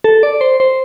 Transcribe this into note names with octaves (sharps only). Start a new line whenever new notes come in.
A4
D5
C5
C5